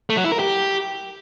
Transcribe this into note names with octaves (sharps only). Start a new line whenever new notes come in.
A3
F#3
E4
A#4
G4